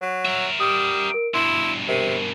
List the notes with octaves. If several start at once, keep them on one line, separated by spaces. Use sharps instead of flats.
F#3
A#4 E5
G3 D#6
A#4 D7
G2 B2 E4 C6
C3 A#4 D#7